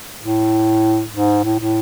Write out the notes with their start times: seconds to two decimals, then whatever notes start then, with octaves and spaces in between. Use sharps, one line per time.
0.22 A2
1.13 G#2
1.44 A2
1.60 A2